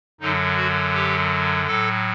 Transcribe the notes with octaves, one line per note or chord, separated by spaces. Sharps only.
F#2 D3 F#3 D#4
F#4
G4
A2 F#3 A4